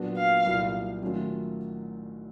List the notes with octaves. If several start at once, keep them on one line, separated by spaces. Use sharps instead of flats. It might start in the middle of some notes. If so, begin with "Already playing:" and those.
Already playing: A#2 F#3 B3 D4 F#4
F5
C2 A#2 F#3
D#3 F#3 A3 C#4 F4